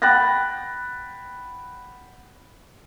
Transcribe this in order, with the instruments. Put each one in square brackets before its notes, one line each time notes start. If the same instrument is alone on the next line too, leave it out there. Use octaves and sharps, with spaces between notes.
[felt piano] F#5 G5 B5 F#6 A6 A#6